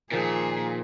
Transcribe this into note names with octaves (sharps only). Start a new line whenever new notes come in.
A#2 D#3 F3 G#4